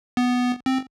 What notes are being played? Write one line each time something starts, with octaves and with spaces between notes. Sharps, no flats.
B3
C4